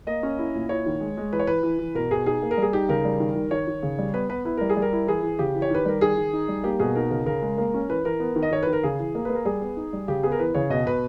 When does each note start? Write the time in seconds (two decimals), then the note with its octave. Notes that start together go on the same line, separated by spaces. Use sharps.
0.07 A#3 D#5
0.23 C#4
0.39 E4
0.55 A#2
0.69 E4 C#5
0.86 D#3
1.01 G#3
1.17 G#3
1.33 E3 B4
1.39 C#5
1.47 E3 B4
1.63 E3
1.79 E3
1.95 B2 A#4
2.11 B2 G#4
2.26 D#4 G#4
2.42 A#3
2.51 A#4
2.58 G3 G#4
2.73 D#4 G4
2.89 C#3 A#4
3.05 G3
3.20 D#3
3.35 D#3
3.51 D#3 C#5
3.68 D#3
3.83 C#3
3.98 G3
4.13 B3 B4
4.29 B3 B4
4.45 E4 B4
4.57 G3 A#4
4.69 G#4
4.77 G3
4.82 A#4
4.93 E4
5.07 E3 G#4
5.23 E3
5.39 C#3 G4
5.55 E3
5.62 C#5
5.71 D#3 B4
5.85 G3 A#4
6.01 D#3 G#4
6.18 D#3
6.33 D#4
6.48 G3
6.64 A#3 G4
6.79 B2 G#4
6.95 D#4 A#4
7.10 C#3 A#4
7.26 C#3 A#4
7.42 G#3
7.58 A#3
7.74 C#4
7.89 E3 B4
8.05 E3 A#4
8.20 B3
8.36 D#3
8.42 D#5
8.51 D#3 C#5
8.63 D#3 B4
8.73 A#4
8.83 C#3 G#4
8.99 E3
9.15 A#3
9.25 A#3 B4
9.35 A#4
9.45 G3 G#4
9.61 B3
9.77 D#4
9.93 G3
10.08 C#3 G4
10.23 B3 G#4
10.32 A#4
10.39 E3 B4
10.55 C#3 C#5
10.70 B2 D#5
10.86 B2 B4